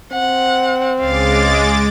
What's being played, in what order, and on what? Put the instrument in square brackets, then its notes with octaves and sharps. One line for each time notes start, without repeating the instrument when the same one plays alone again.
[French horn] C4 [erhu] F#5
[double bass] C#2 C#3 [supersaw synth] G#3 D6 A6 [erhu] F5